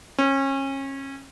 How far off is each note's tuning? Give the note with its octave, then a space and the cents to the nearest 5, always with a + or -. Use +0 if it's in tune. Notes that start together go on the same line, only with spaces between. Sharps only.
C#4 -30